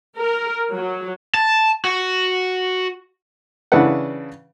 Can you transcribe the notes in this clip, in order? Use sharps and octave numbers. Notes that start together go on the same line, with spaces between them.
A#4
F#3
A5
F#4
C#3 E3 D4 B4 F#5